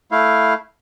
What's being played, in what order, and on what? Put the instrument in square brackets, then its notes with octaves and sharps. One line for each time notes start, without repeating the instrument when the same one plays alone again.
[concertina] A3 E4 F5